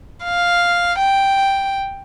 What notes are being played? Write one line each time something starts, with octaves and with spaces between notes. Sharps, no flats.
F5
G5